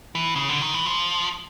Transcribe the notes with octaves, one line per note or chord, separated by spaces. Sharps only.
E3
C#3
D3
D#3
E3
F3